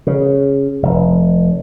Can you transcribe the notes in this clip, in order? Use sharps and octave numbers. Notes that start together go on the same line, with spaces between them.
C#3
F1